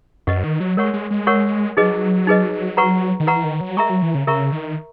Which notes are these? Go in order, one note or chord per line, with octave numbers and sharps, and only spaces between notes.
F#2 B4 D#5 F#5 C#6
D#3
F#3
G#3 A#4 C#5 F#5 C#6
G#3
G#3
A#4 C#5 F#5 C#6
F#3 D#4 G#4 B4 D#5
D#4 G#4 B4 D#5
B4 F#5 A#5 C#6
D#3
E3 B4 F#5 A#5 C#6
D#3
F#3
G#3 A#4 E5 A#5 C#6
F#3
E3
C#3
C#3 A#4 E5 A#5 C#6
D#3